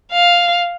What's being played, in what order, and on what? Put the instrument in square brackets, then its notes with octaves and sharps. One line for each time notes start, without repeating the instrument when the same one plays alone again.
[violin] F5